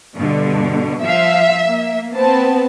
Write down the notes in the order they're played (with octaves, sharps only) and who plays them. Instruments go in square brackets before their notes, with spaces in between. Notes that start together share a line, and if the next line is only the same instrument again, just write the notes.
[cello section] G2 B2 D3
[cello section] F3 F5 [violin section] E5
[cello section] A#3
[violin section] B3 C4 A5